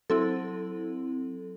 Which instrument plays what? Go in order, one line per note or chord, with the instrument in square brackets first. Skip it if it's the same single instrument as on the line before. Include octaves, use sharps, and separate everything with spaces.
[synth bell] F#3 C4 E4 A4